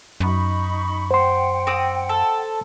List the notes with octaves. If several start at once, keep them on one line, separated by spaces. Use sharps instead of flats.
F#2 D#4 B5 C#6
C5 F#5 G5 C6
C4 D6 D#6
A4